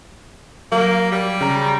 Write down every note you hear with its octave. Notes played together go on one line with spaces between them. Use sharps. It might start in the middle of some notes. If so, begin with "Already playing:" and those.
F#3 A#3
G3
C#3 A#5